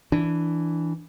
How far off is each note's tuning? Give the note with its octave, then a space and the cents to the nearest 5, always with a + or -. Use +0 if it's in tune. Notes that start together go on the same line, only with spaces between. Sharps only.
E3 +0 D4 +0